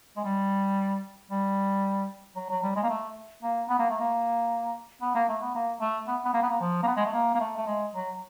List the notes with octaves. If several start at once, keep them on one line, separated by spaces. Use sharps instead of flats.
G#3
G3
G3
F#3
F#3
G3
G#3
A#3
A3
A#3
B3
A#3
A3
A#3
B3
A#3
A3
B3
A#3
A3
B3
B3
A#3
B3
A#3
F3
A#3
B3
G#3
A3
A#3
A#3
A3
A3
G#3
F#3